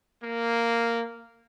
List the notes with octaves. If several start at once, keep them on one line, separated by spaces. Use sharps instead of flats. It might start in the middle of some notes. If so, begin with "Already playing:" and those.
A#3